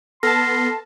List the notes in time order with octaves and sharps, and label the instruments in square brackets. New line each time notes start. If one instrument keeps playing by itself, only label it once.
[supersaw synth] B3 [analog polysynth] A4 A5 [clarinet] C6 [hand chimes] F6 A#6